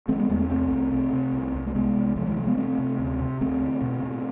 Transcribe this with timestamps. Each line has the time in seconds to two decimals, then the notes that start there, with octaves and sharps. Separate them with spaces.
0.08 D3 A3 C4
0.19 G#3 B3
0.29 E2 G#3 B3
0.39 A3 C4
0.50 C2 A3 C4
0.71 C2
0.91 C3
1.13 C3
1.33 C2
1.54 C2
1.67 A3
1.75 C3 G#3 B3
1.96 C2
2.16 C3 F3 A3
2.26 E3 G#3
2.36 C3 F3 A3
2.47 G#3 B3
2.57 C3 A3 C4
2.79 C3
2.99 D2
3.20 C3
3.41 D2 A3 C4
3.62 D3
3.82 B2
4.03 B2